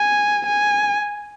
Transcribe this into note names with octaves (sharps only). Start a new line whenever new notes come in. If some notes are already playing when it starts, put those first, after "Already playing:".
Already playing: G#5
G#5